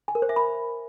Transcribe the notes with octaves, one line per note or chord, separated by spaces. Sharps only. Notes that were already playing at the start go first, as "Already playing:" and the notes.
G#5
A#4
C5
E5
B5